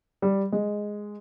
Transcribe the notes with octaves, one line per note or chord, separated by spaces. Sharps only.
G3
G#3